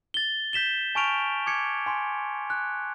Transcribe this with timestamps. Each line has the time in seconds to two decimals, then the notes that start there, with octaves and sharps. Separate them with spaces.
0.14 A6 G7
0.53 G6 B6 E7 G7
0.95 G#5 A5 C#6 F6 D7 F7
1.46 D6 G#6 C#7
1.86 G#5 C6
2.50 F#6